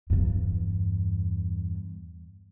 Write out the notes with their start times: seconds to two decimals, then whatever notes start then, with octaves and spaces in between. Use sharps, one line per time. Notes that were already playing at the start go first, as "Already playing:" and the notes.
0.10 E2 G2